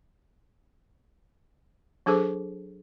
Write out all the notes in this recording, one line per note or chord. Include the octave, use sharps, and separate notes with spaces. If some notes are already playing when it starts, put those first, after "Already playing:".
F#3 D4 G#4 A4 C5